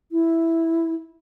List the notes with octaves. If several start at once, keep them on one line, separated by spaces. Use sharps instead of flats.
E4